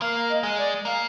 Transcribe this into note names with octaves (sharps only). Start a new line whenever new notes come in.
A#3 F5
D#5
G#3
D5
A#3 F5